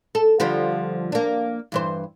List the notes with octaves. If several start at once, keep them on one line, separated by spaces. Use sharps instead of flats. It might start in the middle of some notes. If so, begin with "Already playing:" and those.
A4
D3 F3 G3
A#3 D4
G2 E3 C5